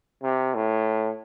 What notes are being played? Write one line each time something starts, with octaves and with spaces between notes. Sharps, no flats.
C3
A2